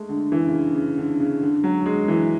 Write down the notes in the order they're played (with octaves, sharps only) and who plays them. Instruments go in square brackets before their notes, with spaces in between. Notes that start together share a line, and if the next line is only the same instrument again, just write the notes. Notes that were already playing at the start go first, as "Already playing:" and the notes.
Already playing: [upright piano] G#3 A3
D3
E3
C#3
D3
C#3
D3
C#3
D3
F#3
G#3
E3